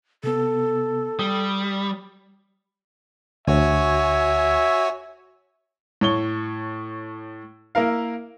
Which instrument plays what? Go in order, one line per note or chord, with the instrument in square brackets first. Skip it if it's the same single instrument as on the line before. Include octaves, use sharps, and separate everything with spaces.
[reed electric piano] C3 B3 [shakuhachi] A4
[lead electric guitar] G3 [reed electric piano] D#6
[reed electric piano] D2 [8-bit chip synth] F#4 C#5 G#5 [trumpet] E5
[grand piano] A2 C#5 G7
A#3 E4 A#4 F5